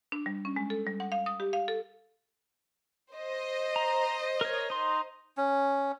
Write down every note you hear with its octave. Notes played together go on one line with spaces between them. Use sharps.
D4
G3
C#4
G#3
A4
G3
F#5
F5
D#6
G4
F5
A4
C5 D#5
A#5
A#4 C#5
D#4 C6
C#4